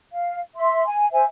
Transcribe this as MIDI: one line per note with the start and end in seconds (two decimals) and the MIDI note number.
0.12 0.39 77
0.56 0.85 76
0.56 0.85 84
0.87 1.07 80
1.12 1.25 72
1.12 1.25 76
1.12 1.25 80